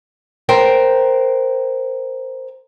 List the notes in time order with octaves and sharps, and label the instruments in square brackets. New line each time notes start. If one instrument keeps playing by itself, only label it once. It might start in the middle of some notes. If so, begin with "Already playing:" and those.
[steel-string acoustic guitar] A#4 C5 G5